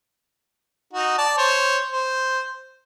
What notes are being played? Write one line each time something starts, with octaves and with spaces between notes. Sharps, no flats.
D#4 F#4
D5 A5
C5 C#5
C5